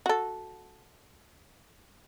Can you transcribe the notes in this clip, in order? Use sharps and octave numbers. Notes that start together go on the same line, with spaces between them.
F#4 A4